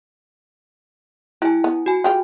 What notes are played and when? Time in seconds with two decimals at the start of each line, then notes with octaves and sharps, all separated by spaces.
1.42 G3 E4 G#5
1.64 B3
1.86 F#4 G#5
2.04 F4 G4 G#4